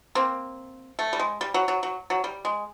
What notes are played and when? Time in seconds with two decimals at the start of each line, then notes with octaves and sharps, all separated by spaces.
0.15 A#3 C4
0.99 A3
1.13 G3
1.19 G#3
1.41 G3
1.54 F#3
1.68 F#3
1.83 F#3
2.10 F#3
2.24 G3
2.45 G#3